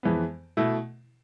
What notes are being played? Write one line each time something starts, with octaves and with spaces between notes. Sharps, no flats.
F2 E3 G#3 B3
B2 A3 E4